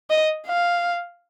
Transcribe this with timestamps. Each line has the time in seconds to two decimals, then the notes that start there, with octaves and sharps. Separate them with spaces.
0.10 D#5
0.46 F5